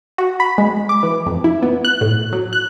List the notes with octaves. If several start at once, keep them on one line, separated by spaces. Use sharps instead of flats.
F#4
B5
G#3
D6
E3
F2
E4
B3
F#6
A2
F#3
F#6